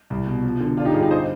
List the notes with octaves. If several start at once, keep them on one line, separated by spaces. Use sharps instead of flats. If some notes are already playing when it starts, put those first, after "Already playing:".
C2
B2
F3
D3
D3 D4 F4
D#4 G4
G2 F4 G#4
D#4 G4
C5 D#5